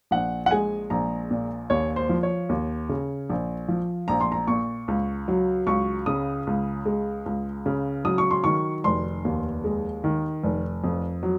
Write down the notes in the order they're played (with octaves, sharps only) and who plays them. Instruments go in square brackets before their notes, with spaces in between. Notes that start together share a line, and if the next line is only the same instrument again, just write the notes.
[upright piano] A#1 F#5
F#5
G#3 G#5
A#1 A#5
A#2
D#2 C#5
C5
F3
C#5
D#2
C#3
A#1
F3
A#1 A#5
C6
A#5
A#2 C#6
C#2
F#3
C#2 C#6
C#3 D#6
C#2
G#3
C#2
C#3
F#3 D#6
C#6
C6
D#3 C#6
F1 C6
D#2
G#3
D#3
F1
F2
F#3